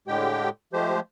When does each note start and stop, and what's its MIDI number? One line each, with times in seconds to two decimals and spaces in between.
0.08 0.49 45
0.08 0.49 50
0.08 0.49 56
0.08 0.49 67
0.08 0.49 79
0.73 1.00 53
0.73 1.00 56
0.73 1.00 57
0.73 1.00 67
0.73 1.00 72